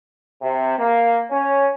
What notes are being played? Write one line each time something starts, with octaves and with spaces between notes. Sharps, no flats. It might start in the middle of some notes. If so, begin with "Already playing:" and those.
C3
A#3
C#4